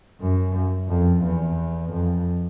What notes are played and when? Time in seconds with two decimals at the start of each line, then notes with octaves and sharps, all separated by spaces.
0.20 F#2
0.88 F2
1.24 E2
1.92 F2